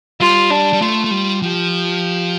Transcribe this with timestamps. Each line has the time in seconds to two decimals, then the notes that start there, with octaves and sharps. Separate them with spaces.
0.20 G3 F4
0.50 D4
0.73 G3
0.81 A3 F4
1.04 A3
1.11 G3
1.42 F3 G4